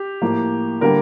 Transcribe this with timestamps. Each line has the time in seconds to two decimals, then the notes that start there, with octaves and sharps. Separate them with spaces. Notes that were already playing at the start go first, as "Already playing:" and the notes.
Already playing: G4
0.22 A2 F3 A#3
0.81 D3 G3 A#3 A#4